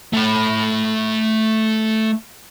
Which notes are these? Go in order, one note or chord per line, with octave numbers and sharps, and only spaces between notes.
A3 B5